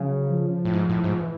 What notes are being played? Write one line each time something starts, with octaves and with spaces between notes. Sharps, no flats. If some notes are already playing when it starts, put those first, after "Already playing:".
Already playing: C#3 F#3
F3
A2
G#2
A2
G#2
E3